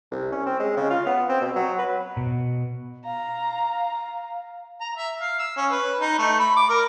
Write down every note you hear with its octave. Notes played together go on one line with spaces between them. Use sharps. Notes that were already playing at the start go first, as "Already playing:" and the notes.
C2
C#4
C4
G#3
C#3
F4
B3
C4
B2
F#3
B4
B2
F5 A#5
A#5
E5
F5
E6
C#4
B4
D#4
A3
B5
D6
A#4